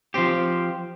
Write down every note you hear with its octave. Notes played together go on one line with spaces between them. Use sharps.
F3 C4 G4